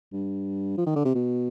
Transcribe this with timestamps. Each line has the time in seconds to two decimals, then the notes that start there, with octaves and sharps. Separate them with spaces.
0.13 G2
0.78 F3
0.87 D#3
0.96 D3
1.05 C3
1.15 B2